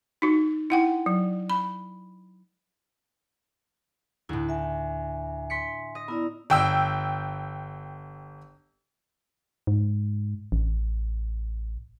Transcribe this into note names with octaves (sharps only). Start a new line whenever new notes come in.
D#4 F#4
E4 F#5 G5
F#3
B5
D2 A2 E4
E5 G#5
C6 B6 C#7
D#5
B3 E4 A#4 D5
G1 G5 E6
G#2
A1